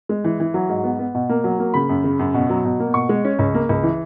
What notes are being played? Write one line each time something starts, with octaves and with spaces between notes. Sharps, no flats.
G#3
E3
E3
F#3
G#2
B3
B3
B2
A#3
F#3
A#3
C#3 B5
F#2
C#3
F#2
B2
F#3
B2
A#3
B2 C#6
G#3
C#4
C#2
A#3
C#2
E3